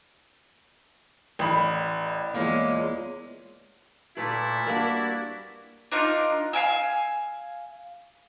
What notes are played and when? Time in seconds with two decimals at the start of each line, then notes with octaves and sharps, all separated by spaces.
1.39 A1 D5 B5
2.34 E2 G#3 A#3 F4 C#5 D5
4.17 A#2 A3 E4 B4 C#5 D5
4.66 G3 A#3 D4 F#4 A#4 D5 F5
5.92 D4 D#4 F4 A#4
6.53 F5 G5 G#5 E6